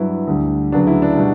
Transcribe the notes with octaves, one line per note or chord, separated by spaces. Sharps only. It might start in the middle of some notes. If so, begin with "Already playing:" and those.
Already playing: G2 F#3 B3 E4
D2 D3 G3
D2 C#3 F#3 B3 D4
E4
D4
B2 G3